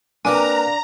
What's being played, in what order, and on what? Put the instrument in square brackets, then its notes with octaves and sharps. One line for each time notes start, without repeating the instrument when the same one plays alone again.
[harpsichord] A#3 C4 B4 [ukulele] D4 D5 [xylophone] G#5 [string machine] A#5